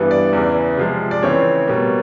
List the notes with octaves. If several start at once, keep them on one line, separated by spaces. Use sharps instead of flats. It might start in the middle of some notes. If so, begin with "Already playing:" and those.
Already playing: G2 E3 G3 B3
D5
E2 C#3 E3
C3 F3 G#3
D5
C#3 E3 A3 C4 C#5
B2 G3 A#3